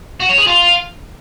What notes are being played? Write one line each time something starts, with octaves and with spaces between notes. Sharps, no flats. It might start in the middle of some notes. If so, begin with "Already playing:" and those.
F#4
C#5
G#4
F4